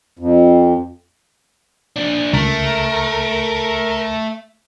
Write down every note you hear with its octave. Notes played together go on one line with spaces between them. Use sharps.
F2
A#2 D4
C#2 A3 A#4